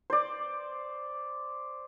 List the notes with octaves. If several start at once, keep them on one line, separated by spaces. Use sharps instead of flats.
C5 D5